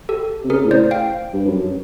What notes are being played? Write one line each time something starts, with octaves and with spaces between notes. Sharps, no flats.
G4 A4
C3
C#3 G#4 A#4
A2
C5 D5
F5 G5
G2
F#2